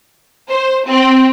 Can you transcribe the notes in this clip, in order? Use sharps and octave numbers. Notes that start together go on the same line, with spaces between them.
C5
C4